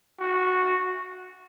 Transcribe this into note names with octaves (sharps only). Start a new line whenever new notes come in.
F#4